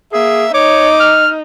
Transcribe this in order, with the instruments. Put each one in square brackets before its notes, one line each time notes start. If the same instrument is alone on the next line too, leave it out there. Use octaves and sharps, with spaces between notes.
[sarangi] A#3 [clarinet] G#4 [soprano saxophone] E5
[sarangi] D#4 [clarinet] C#5 [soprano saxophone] D6
[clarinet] F6